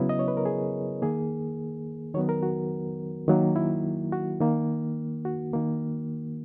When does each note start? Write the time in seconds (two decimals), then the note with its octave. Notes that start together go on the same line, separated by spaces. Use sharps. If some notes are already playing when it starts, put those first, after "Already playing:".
Already playing: C#3 F#3 B3 E4
0.09 D#5
0.19 C#5
0.28 B4
0.37 A#4
0.45 G#4
1.02 D#3 A#3 G#4
2.14 D#3 F#3 B3 C#5
2.29 A#4
2.43 F#4
3.28 D#3 F#3 A#3
3.56 E4
4.12 F#4
4.41 D#3 A#3
5.25 F#4
5.53 D#3 A#3